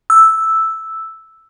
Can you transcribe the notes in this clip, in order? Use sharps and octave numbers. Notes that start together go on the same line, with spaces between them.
E6